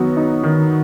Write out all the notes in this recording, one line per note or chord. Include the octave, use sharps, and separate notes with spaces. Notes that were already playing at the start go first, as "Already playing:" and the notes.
Already playing: D#3 F#3 B3 F#4
D#4
D#3